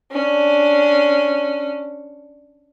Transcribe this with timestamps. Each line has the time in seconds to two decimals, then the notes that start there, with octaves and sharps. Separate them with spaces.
0.12 C#4 D4